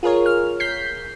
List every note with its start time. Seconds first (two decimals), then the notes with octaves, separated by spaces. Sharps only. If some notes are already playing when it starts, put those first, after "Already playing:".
0.03 F4 G#4 A#4 C#5
0.26 F6
0.60 G6 B6 C7